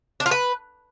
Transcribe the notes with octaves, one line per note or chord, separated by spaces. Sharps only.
D4
F4
B4